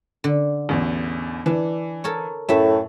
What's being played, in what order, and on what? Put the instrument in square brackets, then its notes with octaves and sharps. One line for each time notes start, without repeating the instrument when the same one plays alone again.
[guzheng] D3
[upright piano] A1 E2
[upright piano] E3 [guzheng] D4
[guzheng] A4 A#4 C#5
[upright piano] F#2 [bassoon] A2 [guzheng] A3 E5